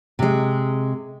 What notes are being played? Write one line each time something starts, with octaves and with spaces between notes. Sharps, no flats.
C3 G#3